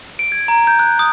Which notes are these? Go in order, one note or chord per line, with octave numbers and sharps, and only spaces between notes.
D7
G#6
A#5
G6
F#6
D#6